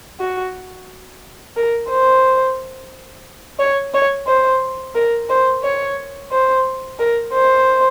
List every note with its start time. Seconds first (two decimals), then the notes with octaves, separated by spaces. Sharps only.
0.20 F#4
1.56 A#4
1.90 C5
3.59 C#5
3.94 C#5
4.27 C5
4.95 A#4
5.30 C5
5.63 C#5
6.31 C5
6.99 A#4
7.33 C5